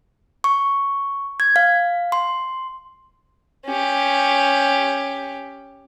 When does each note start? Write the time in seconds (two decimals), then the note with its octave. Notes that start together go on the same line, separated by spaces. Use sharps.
0.44 C#6
1.40 G#6
1.56 F5
2.12 C6
3.66 C#4 G4